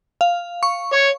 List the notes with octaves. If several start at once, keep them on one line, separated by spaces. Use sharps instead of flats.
F5
C#6
C#5